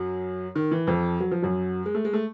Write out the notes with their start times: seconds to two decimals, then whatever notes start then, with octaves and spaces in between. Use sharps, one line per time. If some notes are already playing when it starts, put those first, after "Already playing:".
Already playing: F#2 F#3
0.56 D#3
0.71 E3
0.87 F2 F3
1.20 F#3
1.31 F3
1.42 F#2 F#3
1.86 G#3
1.95 A3
2.05 G#3
2.13 A3